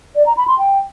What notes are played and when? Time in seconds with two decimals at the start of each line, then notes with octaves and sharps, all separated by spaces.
0.16 D5
0.26 A#5
0.37 B5
0.48 C6
0.58 G5